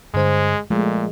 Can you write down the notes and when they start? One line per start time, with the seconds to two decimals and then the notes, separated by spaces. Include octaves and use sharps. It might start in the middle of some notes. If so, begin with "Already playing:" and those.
0.14 G2 D3 G#3 C5
0.70 A#2 F3 G#3 A3